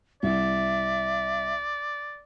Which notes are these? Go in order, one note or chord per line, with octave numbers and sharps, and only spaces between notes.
C2 D5 E5